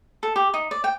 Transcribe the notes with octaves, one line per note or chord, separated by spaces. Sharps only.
A4
G4
D#4
D5
G5